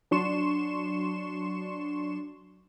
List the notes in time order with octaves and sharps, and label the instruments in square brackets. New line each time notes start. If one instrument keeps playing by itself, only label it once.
[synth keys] F#3 D4 C6 C#6 E7